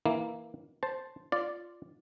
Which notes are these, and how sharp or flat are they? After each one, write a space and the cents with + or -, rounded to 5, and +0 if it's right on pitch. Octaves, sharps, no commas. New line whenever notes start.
E3 -10 A#3 +0 E4 +0
C5 +0 A5 +0
F4 -10 D5 +0